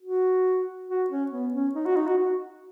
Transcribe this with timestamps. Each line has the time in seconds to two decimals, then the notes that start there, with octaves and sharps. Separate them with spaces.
0.02 F#4
0.89 F#4
1.10 C#4
1.32 B3
1.54 C#4
1.75 D#4
1.86 F#4
1.96 D#4
2.07 F#4
2.18 F#4